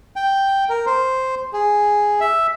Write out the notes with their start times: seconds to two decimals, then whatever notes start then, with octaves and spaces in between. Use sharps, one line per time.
0.16 G5
0.69 A#4
0.86 C5
1.53 G#4
2.20 E5